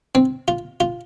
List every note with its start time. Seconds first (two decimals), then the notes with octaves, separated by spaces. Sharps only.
0.15 C4
0.48 F4
0.80 F4